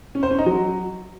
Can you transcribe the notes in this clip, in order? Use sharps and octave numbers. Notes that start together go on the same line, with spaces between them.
C#4
C5
C#4
D#4
F#3